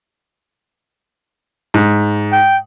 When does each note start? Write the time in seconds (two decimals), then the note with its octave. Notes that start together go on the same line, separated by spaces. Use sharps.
1.74 G#2
2.32 G5